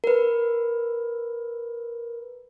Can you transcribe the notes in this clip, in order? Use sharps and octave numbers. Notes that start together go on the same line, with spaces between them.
A#4 B4